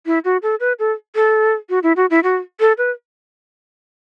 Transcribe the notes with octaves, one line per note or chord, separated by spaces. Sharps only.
E4
F#4
A4
B4
A4
A4
F#4
E4
F#4
E4
F#4
A4
B4